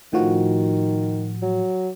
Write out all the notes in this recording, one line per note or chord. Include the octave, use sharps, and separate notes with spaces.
A2 D#3 F3 F#4
F#3